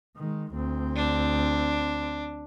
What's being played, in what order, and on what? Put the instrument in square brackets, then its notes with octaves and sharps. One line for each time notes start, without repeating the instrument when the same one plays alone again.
[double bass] D#3 G#3
D2 C4
[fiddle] D4